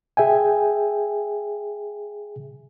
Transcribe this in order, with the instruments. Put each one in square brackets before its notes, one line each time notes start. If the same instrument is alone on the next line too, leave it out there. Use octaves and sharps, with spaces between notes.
[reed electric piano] G#4 E5 G5 G#5